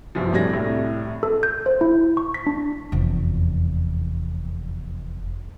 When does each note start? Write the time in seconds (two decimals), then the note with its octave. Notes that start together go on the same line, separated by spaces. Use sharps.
0.15 G1 C2 F#2 C3 F3
0.32 A2 C3 G3 D4 G#6 A#6
0.53 C2 A2 G3
1.23 A4
1.43 G6
1.66 C5
1.81 E4
2.17 C#6
2.34 B6
2.46 D4
2.92 F1 E2